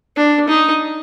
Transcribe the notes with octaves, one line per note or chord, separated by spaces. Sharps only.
D4
D#4